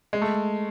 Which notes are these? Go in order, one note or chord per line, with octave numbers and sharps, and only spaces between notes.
G#3
A3